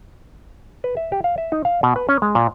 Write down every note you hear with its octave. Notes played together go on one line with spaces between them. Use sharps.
B4
E5
G4
F5
E5
D#4
F5
B2
B4
C#4
G#3
A#2